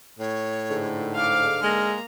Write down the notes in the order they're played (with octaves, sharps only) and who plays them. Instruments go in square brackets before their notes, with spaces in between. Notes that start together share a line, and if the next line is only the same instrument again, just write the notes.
[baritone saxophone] A2 [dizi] C#5
[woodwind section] G#2 D3
[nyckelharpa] F5 D6 [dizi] F6
[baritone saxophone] G#3 [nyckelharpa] A#3 A#5